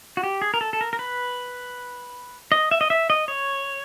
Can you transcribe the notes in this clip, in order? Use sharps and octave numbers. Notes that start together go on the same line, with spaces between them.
F#4
G4
G#4
A#4
A4
A4
A#4
A#4
B4
D#5
E5
D#5
E5
D#5
C#5